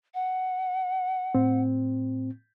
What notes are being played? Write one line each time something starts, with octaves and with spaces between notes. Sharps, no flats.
F#5
A2 C4